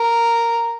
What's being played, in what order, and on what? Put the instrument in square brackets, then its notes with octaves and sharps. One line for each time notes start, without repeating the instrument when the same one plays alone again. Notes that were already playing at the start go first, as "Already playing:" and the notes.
Already playing: [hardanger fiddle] A#4